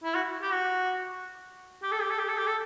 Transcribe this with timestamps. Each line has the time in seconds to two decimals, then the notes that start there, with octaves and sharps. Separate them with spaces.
0.03 E4
0.15 F#4
0.42 G4
0.52 F#4
1.82 G4
1.91 A4
2.01 G4
2.10 A4
2.18 G4
2.28 A4
2.37 G4
2.46 A4